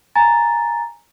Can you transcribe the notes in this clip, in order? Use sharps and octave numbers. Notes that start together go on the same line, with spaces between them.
G#5 A#5 A6